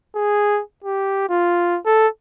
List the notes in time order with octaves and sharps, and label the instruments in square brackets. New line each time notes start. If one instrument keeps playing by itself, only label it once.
[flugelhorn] G#4
G4
F4
A4